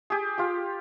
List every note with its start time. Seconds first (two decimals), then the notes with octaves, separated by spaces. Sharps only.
0.10 G4 G#4
0.38 F4 G4